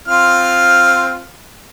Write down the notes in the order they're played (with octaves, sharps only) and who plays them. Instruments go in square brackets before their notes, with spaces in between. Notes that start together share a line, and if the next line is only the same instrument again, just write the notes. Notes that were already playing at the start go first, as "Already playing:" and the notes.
[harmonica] C4 F4 F6